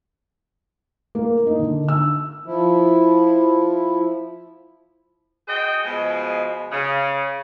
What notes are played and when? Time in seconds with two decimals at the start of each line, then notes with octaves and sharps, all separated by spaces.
1.15 A#3
1.47 D#4
1.59 D3
1.88 E6
2.46 F3 E4
5.48 F#4 G#4 C5 D#5 G5
5.85 B2 F3 G#3
6.71 C#3